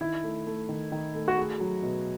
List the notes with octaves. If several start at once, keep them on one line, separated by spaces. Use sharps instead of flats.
D#3 E4
A3
A3
D#3
D#3
A3
F#4
A3 G#4
F#3
B2